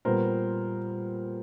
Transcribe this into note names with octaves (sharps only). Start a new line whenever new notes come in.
A#2 G3 B3 A#4 C5